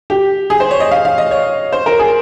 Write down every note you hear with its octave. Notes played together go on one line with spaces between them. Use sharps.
G4
G#4
C5
C#5
D#5
F5
F5
D#5
C#5
C5
A#4
G#4